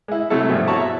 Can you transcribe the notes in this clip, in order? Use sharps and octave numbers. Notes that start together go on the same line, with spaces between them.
G#3 E4
C3 F#3 A3 E4 A4
G2 B2 F3 G#4 E5
E4 F#4 C#5 A5 A#5
E5